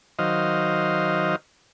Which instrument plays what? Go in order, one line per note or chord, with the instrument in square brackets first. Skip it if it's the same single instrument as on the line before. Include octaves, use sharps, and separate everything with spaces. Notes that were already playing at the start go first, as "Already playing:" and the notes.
[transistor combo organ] D#3 F#3 C5 D#5 F5